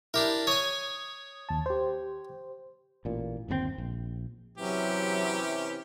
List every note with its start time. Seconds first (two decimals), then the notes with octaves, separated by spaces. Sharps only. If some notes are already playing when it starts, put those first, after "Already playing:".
0.14 D4 E4 G4 A#4
0.47 C#5 G#5 D#6
1.49 D#2 A5
1.66 G4 C5
3.05 A1 A#2
3.49 G1 D#2 A#2 C4
3.78 A#1
4.58 C3 E3 F#3 C#4 G4